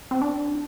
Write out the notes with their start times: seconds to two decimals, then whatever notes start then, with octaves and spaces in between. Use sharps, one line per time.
0.11 C4
0.22 D4